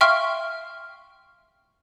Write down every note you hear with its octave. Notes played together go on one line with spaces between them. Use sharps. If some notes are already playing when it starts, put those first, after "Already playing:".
E5 F5 G5 C6 C#6 F6